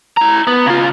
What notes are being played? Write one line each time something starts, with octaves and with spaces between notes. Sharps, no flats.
E4 A#5
B3
C#3 F4